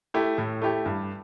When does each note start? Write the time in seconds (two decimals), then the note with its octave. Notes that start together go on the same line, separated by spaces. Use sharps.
0.14 A3 E4 G4
0.38 A2
0.62 A3 E4 G4
0.86 G2